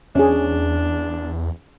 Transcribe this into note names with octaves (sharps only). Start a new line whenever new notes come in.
E2 C#4 D4 G#4